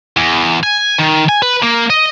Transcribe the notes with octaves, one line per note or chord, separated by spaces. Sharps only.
E2
G#5
D#3
G#5
B4
A#3
D#5